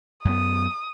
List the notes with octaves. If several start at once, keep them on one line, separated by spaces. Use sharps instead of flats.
F#2 B3 D#6